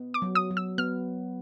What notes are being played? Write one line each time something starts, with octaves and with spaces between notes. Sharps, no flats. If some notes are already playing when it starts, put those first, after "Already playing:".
Already playing: B3
D6
F#3
D#6
F#3
E6
B3 F6